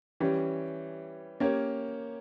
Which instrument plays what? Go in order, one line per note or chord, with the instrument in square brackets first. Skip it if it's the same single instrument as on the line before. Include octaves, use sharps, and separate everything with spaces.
[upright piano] E3 G3 C#4 G4
A#3 C#4 G4 A#4 C#5